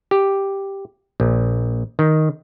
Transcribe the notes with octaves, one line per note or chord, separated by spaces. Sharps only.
G4
A#1
D#3